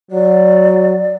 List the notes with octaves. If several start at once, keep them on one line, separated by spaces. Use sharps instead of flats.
F#3 D5